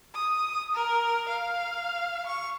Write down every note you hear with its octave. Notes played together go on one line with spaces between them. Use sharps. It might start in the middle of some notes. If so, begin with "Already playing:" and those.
D#6
A#4
F5
C#6